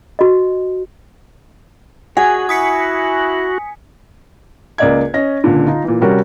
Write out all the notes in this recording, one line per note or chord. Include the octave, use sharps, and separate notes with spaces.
F#4 D#5
F#4 G#4 F#5 G#5
E4 D#6 B6 C#7
C#2 A#3 D5 D#5 G#6
C#4 D#5 A#6
C#2 A#2 D3
D#4 F4
A#2 E3
C3 G3 C#4 F#4 A#4